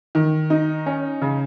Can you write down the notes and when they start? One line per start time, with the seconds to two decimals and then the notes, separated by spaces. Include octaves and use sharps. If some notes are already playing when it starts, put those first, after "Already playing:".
0.15 D#3
0.50 D#4
0.86 C#4
1.22 C#3